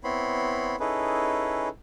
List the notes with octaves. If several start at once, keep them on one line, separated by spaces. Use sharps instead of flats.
B3 C4 E4 C#5 B5 C6
C#4 D#4 E4 G#4 A4 B4